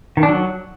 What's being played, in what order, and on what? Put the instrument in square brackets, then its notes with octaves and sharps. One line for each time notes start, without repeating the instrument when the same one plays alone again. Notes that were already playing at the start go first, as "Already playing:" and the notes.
[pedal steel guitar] D#3
D4
F#3